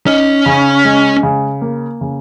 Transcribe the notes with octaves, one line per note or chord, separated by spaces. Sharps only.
C#4 D#4
C#3
G#3
C#3
A#3
C#3